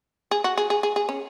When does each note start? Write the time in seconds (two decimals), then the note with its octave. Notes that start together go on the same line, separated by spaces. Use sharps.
0.31 G#4
0.44 F#4
0.58 G#4
0.70 G#4
0.83 G#4
0.96 G#4
1.09 C#4